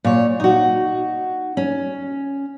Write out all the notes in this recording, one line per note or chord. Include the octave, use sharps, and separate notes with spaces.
A#2 C#5
D#4 F#4
C#4